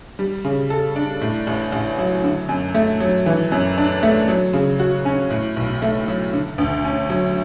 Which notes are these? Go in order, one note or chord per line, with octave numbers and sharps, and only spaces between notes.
G3
C#3
A4
D4
A2
A1
A1
F#3
D3
F#2
A3
F#3
E3
F#2
D4
A3
F#3
C#3
F#4
C#4
A2
B1
A3
F#3
D3
D2
C#4
F#3